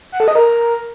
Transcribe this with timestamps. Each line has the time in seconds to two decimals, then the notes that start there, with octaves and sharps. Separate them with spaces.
0.12 F#5
0.20 A4
0.28 D#5
0.35 A#4